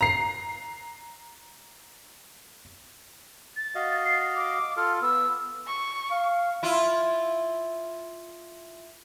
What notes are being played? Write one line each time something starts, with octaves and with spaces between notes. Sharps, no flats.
A#5 C7
A6
F#4 D#5 F5
C7
D6
F4 A4 F6
B3 E6
C#6
F5
E4 F4